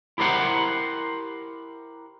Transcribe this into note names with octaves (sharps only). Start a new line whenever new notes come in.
E4 G4 A#4 C5 F#5